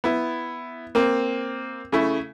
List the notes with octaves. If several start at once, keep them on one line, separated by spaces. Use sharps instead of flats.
B3 E4
A#3 C4
C#3 A3 E4